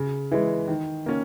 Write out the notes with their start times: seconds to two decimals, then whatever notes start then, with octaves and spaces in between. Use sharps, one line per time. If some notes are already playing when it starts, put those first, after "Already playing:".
Already playing: C#3
0.32 E3 G#3
0.68 D#3
1.06 A#3 C#4